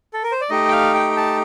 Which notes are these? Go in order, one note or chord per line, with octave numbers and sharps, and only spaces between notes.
A4
A#4
C5
D5
A3 D#4 G4 D#5
G5
F5
G5
G5
A5